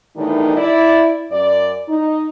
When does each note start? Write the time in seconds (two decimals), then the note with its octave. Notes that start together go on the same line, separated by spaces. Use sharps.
0.16 E2 A2 D#3 G3 D4 D#4
0.56 E4 D5
1.31 F#2 D5
1.88 D#4